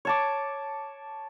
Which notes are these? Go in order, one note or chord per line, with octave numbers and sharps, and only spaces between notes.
C#5 A5 D6